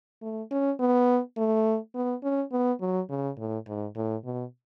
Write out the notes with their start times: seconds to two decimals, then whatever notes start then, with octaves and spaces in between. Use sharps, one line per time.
0.22 A3
0.51 C#4
0.80 B3
1.37 A3
1.95 B3
2.23 C#4
2.52 B3
2.81 F#3
3.10 C#3
3.38 A2
3.67 G#2
3.96 A2
4.24 B2